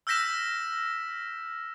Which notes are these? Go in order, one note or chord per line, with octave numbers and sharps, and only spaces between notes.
E6 F6 G6 A#6 B6 E7